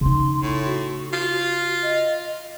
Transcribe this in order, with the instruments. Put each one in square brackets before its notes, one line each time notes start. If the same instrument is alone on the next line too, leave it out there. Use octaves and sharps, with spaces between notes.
[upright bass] C#3 D#4 [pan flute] C6
[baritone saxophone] A2
[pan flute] F#4
[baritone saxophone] F4
[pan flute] D#5